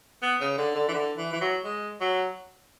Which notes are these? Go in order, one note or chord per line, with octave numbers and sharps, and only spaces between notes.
B3
C#3
D3
D3
E3
D3
E3
E3
F#3
G#3
F#3